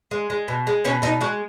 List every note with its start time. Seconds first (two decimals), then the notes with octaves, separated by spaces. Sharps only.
0.11 G#3
0.30 G#3
0.48 B2
0.67 G#3
0.85 B2 C#4
1.02 B2 D#4
1.21 G#3 F#4